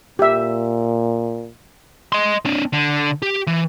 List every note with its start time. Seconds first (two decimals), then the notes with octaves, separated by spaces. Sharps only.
0.19 A#2 G4 E5
2.12 D#5 C6
2.45 C4 D4
2.73 D3
3.22 G4
3.47 E3